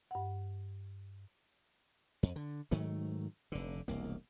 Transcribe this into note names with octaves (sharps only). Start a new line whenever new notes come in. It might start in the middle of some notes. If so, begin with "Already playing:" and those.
G2 F#5
F2
D3
G#2 D#3 F#3 A3
F1 D3
E1 C2 A#3